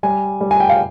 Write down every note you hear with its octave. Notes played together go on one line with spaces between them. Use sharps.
G3 G#5
G3
G#5
G5
F5